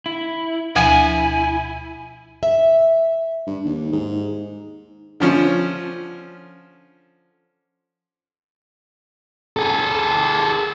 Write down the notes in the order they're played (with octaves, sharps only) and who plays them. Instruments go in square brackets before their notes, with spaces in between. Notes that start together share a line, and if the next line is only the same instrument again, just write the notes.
[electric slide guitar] E4
[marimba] D2 B2 F3 [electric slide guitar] E4 [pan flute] G#5
[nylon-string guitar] E5
[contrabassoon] G2
D#2
G#2
[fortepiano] D3 F3 C#4
[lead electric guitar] G#4 A4